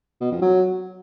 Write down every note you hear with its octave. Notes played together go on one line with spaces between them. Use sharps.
B2
F2
F#3